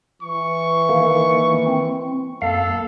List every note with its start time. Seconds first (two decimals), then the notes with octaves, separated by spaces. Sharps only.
0.22 E3 C#6
0.89 D#3 A#3
1.67 C4
2.42 F#2 A#3 A4 F5